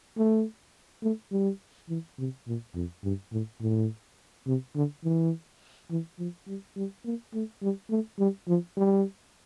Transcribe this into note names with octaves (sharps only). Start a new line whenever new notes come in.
A3
A3
G3
E3
C3
A#2
F2
G2
A2
A2
C3
D3
E3
E3
F3
G3
G3
A#3
A3
G3
A3
G3
F3
G3